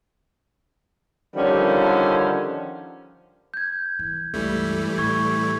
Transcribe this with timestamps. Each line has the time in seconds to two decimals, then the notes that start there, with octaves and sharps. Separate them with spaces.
1.36 D3 D#3 F3 G3 C#4
3.54 G6 G#6
3.99 E3
4.34 C#2 G2 E3 G3 A3
4.98 A2 C#6 G#6